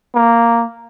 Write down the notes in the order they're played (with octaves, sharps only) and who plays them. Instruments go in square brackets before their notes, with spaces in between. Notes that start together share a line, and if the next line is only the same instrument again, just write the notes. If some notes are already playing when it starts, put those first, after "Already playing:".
[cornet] A#3